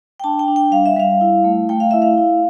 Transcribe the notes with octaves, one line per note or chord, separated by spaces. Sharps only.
G5
D4 A5
G5
D4
G5
G3 F5
E5
G3 F5
E4
A3
A3 G5
F5
E4 E5
F5
E4